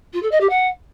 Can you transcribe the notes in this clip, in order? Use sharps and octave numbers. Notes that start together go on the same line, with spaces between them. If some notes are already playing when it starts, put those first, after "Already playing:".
F4
A4
D#5
G4
F#5